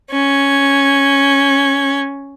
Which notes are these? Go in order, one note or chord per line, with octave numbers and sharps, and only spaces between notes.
C#4 G#6